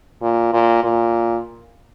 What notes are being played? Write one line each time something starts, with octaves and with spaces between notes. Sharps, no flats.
A#2
A#2
A#2